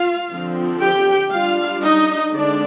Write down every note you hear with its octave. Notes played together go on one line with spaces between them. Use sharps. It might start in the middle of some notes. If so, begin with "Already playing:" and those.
Already playing: F4 F5
D3 F3 C4
G4 G5
G3 D4 F4 F5
D#4 D#5
D3 G#3 C4 D4 D5